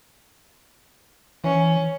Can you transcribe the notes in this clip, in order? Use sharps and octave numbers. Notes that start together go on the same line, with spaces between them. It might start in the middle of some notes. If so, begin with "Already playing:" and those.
E3 C#4